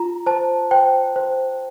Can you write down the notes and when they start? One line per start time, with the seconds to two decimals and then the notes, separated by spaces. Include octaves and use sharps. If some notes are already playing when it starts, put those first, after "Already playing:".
Already playing: F4 A#5
0.26 C5 A5
0.71 C5 G5
1.16 C5